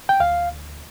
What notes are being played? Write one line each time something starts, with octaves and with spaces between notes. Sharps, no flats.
G5
D2 F5